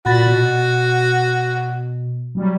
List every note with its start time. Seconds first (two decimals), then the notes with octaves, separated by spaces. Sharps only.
0.06 A#2 F#4 B5 A6
0.26 B2
2.35 F#3 G3